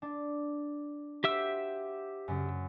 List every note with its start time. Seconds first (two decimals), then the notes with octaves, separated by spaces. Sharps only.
0.02 D4
1.24 F#4 G4 C5 E5 E6
2.28 F#2 C#3